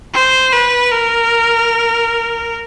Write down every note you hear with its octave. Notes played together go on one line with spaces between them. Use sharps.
C5
B4
A#4